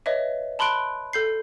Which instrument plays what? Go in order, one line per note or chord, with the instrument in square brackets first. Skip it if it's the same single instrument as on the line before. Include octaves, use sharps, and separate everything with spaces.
[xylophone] B4 C#5 D#5 E5
A5 B5 C6 F#6 D7
A4 G6 C7